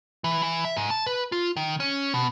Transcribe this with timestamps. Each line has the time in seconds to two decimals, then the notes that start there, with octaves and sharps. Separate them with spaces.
0.24 E3
0.43 E3
0.65 E5
0.77 G#2
0.90 A5
1.06 B4
1.32 F4
1.56 D#3
1.80 C#4
2.14 B2